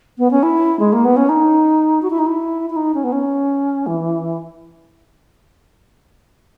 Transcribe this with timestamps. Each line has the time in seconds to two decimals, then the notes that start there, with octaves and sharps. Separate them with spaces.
0.18 B3
0.31 C#4
0.43 E4
0.80 G#3
0.93 A#3
1.05 B3
1.17 C#4
1.29 D#4
2.02 F#4
2.10 E4
2.19 D#4
2.26 E4
2.70 E4
2.76 D#4
2.95 C#4
3.04 B3
3.12 C#4
3.87 E3